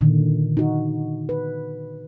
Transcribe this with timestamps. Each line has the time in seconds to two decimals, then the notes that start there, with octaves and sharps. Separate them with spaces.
0.01 A#2 D3 D#3
0.57 D#4 F#4
1.29 B4